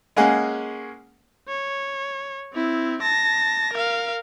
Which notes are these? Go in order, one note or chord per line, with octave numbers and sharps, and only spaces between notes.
G#3 A#3 C#4 G#4 F#5
C#5
C4 E4
A5 A#6
A#4 F5